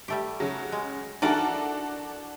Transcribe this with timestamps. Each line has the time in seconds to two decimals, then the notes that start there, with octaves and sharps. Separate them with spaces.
0.08 G3 A3 G4
0.40 C#3 F#3
0.72 G#3
1.22 E3 D4 F#4 A4 A#4 D5